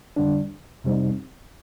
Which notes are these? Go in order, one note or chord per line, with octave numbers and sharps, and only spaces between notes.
F2 D3 G3 D4
F2 C3 G3 C4 D#4